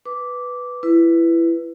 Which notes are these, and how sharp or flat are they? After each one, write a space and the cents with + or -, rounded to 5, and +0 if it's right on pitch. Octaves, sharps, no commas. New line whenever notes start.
B4 +0 D6 -10
E4 +20 B4 +0